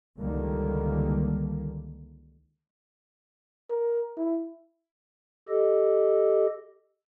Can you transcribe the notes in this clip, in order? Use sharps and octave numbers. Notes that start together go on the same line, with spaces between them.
C#2 D3 D#3 G3 A#3
A#4
E4
G4 A4 D#5